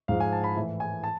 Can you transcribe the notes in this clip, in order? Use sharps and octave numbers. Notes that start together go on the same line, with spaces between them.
G#2 F3 F5
G#5
A5
B5
A2 E3
G#5
A5